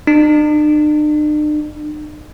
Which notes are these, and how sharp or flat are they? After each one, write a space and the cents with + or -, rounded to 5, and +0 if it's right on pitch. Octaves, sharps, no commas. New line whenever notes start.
D4 +45